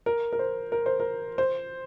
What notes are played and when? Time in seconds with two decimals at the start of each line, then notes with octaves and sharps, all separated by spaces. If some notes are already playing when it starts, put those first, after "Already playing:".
0.06 A#4
0.33 A#4
0.39 C5
0.72 A#4
0.86 C5
1.00 A#4
1.38 C5